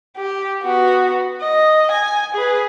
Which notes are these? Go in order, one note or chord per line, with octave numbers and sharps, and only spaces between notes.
G4
B3 F#4
D#5
G#5
G#4 B4